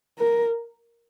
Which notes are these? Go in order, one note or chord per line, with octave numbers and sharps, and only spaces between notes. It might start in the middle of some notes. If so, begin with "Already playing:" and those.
A#4